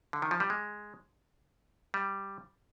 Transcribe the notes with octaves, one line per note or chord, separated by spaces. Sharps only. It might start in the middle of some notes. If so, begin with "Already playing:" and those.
D3
D#3
F3
G3
G#3
G3